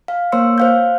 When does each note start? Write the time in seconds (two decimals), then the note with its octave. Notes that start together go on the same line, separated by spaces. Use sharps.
0.08 F5
0.32 A#3 C5 C#5 C6 E6 C#7
0.58 C5 F5 G6